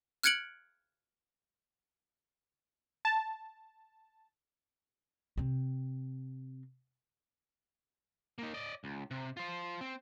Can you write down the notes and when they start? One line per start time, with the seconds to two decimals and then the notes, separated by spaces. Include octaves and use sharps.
0.23 F6 F#6 G#6 C#7 D7 F#7
3.05 A5
5.38 C3 C4
8.38 A#3 D#4
8.54 D5 D#5
8.84 C#2
9.11 C3
9.37 F4 C5
9.81 C4